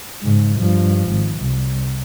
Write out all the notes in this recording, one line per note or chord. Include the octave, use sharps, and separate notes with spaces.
G#2 C#3
G2 F3
G#1
C2